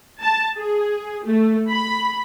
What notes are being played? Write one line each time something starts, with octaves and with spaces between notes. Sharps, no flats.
A5
G#4
A3
B5